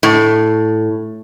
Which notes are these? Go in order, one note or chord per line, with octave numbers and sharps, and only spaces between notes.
A2